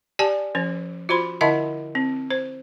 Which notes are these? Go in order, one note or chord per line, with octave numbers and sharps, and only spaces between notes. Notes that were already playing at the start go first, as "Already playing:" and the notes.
G4 D5 G#5 A5
F3 C#4 B4
F4 F#4 C5 B5 C6
D3 E4 D#5 E5 F#5 A5
C4
C5